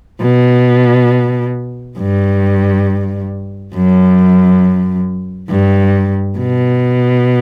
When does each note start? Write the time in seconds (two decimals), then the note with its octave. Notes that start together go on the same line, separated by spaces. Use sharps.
0.22 B2
1.98 G2
3.75 F#2
5.50 G2
6.38 B2